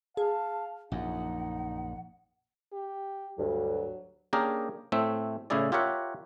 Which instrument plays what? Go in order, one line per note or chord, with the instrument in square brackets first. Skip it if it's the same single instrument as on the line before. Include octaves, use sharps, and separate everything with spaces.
[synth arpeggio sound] G#4 [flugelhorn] F5 [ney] A5
[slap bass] A#1 F#2 [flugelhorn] D#4 [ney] F#5
[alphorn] G4
[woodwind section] D2 G2 [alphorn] F#3
[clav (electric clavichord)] A#3 C#4 D4 G4 G#4 A#4
A2 A3 C4 E5
A2 C#3 C#4 E4 G#4 D5
F4 G4 A#4 C#5 E5 F#5